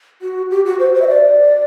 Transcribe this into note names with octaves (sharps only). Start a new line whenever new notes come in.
F#4
G4
F#4
C5
C5
E5
D5